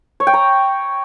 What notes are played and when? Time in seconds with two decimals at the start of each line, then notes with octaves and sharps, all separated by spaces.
0.20 C#5
0.27 G5
0.34 A#5